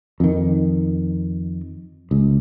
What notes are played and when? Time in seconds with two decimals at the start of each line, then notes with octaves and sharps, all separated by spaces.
0.20 F2 D#3
2.11 C#2